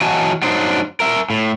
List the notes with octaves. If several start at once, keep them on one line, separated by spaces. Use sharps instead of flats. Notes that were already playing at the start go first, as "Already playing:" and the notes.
E3 F#3 F#4 D#5 G#5 A5
F#3 D4 D#4 C5
A#4 E5
A2